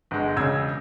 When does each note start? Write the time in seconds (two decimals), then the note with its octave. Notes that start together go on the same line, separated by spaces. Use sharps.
0.11 G1 G#3
0.36 E1 C#2 C#3 E6 G#6